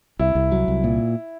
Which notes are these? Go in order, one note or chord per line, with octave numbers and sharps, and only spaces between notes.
C2 E4
C2
F#3
C2
A#2